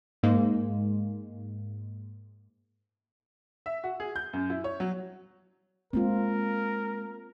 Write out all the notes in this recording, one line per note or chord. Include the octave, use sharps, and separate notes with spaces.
G#2 G#3 A#3
E5
F#4
G#4
G6
F#2
E4
C#5
F#3
G#3 A#3 C4 F4 A#4